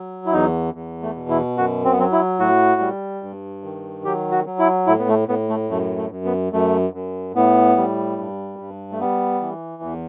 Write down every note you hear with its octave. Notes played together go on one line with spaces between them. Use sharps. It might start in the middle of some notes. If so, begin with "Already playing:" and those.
Already playing: F#3
E4
E2 D#4
E2
A3
B2
E4
F#2 F#4
C4
B3
F#3 C4
E4
A2 F#4
G3
G2
D#3
F#3 G4
F#4
F#3
E4
A2 E4
B3
A3
A2 B3
A3
F#2 A3
A3
F#2
B3
F#2 A3
F#2
A2 B3
G3
G2
G2
A3
G3 B3
E3
E2